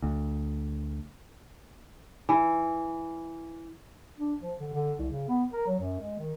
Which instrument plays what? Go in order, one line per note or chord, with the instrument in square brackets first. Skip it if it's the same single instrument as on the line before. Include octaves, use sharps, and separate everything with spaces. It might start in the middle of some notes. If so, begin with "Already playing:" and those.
[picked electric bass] D2
[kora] E3
[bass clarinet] D4
F3
D3
D3
C2
C#3
B3
A#4
F#3
F#2
G#3
D#3